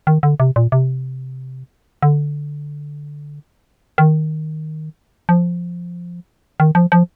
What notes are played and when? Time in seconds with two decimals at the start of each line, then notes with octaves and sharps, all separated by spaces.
0.07 D#3
0.23 D3
0.40 C3
0.56 A#2
0.72 C3
2.03 D3
3.98 D#3
5.29 F3
6.60 D#3
6.75 F3
6.92 F3